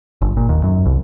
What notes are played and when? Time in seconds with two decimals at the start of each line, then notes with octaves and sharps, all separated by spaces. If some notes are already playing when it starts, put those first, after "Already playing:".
0.22 G1
0.37 A#2
0.49 D#2
0.64 F#2
0.86 C2